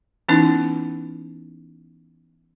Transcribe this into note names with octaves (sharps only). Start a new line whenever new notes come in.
E3 B3 C#4 D#4 E4